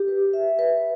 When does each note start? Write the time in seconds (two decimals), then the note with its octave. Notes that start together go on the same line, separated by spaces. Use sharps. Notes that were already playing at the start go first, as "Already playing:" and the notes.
Already playing: G4
0.08 B4
0.33 E5
0.59 B4